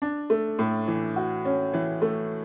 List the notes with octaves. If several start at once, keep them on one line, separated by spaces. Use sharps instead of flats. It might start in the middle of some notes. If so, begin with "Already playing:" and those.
D4
A3
A2
E3
F#4
C#4
E3
A3